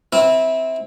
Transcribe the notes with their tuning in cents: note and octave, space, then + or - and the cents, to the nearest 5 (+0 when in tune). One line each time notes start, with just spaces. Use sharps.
C4 +0 E4 -20